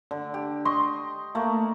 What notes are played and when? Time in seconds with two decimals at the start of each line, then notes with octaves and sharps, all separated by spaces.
0.11 D3
0.34 G4
0.65 D#5 C6 C#6
1.35 A3 A#3